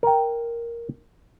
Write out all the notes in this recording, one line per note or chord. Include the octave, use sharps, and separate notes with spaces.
A#4 G5